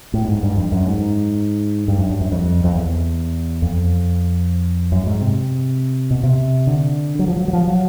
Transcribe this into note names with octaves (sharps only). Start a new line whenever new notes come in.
A2
G#2
G2
F2
F#2
G#2
G2
F#2
G2
F#2
F2
F2
E2
F2
F#2
G#2
C3
B2
C3
D3
F#3
F3
F#3
F#3
F3
F#3